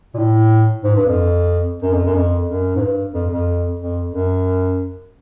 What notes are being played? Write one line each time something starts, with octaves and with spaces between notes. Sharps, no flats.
A#2
A2
G#2
G2
F2
F#2
F2
F#2
F2
F#2
G#2
G2
F2
F2
F2
F#2